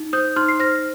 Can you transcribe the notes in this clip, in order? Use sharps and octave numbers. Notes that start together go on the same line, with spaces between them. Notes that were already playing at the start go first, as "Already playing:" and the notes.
Already playing: D#4
C5 D#6 G6
D#4 C6 F6
C7
C5 F6 A#6